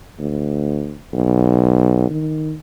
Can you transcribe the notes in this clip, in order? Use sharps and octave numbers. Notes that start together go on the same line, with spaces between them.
D2
B1
D#3